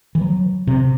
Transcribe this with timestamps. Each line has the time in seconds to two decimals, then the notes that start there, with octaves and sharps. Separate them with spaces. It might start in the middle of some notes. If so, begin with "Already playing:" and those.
0.15 E3
0.21 F#3
0.67 C3